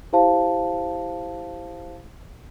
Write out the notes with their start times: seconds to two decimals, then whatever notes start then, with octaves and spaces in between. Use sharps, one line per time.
0.13 E4 G4 C5 F5 A5